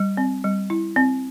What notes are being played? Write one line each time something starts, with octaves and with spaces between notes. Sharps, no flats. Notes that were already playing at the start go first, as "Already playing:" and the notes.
Already playing: G3
C4
G3
E4
C4